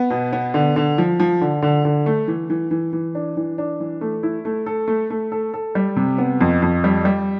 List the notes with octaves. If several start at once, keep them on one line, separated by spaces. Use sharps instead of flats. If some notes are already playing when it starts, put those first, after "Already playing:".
Already playing: B3
B2
B3
D3
D3
F3
F3
D3
D3
D3
A3
E3
E3
E3
E3
D4
E3
D4
E3
A3
E4
A3
A4
A3
A3
A4
A4
G3
C3
B3
F2
F2
G3
G3